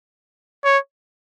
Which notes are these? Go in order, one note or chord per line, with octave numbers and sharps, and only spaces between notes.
C#5